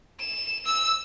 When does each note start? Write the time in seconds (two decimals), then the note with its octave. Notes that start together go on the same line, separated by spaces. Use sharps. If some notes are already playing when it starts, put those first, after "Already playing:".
0.19 E7
0.66 E6